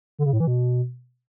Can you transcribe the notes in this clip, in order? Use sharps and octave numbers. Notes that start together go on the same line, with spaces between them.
D3
C#3
A2
E3
B2